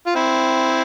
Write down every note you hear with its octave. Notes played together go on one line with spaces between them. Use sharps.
F4
C4 E4